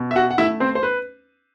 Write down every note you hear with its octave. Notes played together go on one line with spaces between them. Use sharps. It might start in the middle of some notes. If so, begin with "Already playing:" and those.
Already playing: B2
E5
F#4 F#5
F#5
A3 E4 E5
C4 C5
C5
B4